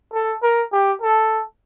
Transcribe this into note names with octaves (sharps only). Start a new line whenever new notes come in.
A4
A#4
G4
A4